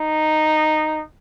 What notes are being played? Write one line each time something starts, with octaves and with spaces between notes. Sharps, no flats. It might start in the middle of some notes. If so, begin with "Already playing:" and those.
Already playing: D#4